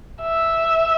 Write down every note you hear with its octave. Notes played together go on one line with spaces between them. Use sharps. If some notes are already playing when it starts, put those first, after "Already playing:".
E5